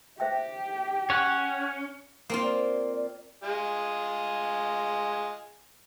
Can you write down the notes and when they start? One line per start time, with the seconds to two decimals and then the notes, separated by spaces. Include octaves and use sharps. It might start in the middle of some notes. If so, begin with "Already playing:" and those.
0.20 G4 C5 E5 G5
1.10 C#4 C#5 F#5
2.30 A#3 C4 F4
2.42 D5
2.95 D5
3.43 G#3 F4 G#4